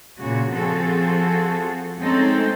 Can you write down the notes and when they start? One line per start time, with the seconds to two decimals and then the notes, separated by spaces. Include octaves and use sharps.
0.18 A#2 C#3 F#4
0.49 F3 C4 F#4 G#4 A4
2.00 G#3 A3 C4 C#4 D#4 A4